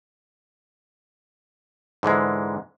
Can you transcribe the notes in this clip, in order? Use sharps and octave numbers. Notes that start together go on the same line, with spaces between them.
G#2 D3 E3 G#3